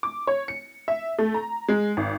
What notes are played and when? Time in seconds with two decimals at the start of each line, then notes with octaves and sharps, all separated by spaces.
0.03 D6
0.27 C#5
0.48 C#7
0.88 E5
1.19 A3
1.34 A#5
1.68 G#3
1.97 G#1